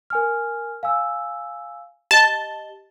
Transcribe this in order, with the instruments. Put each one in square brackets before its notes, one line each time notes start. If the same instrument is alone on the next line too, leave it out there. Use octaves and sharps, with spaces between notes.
[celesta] A#4 G#5 F6
F5 G#5 E6
[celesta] G4 D#5 G7 [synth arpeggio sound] A5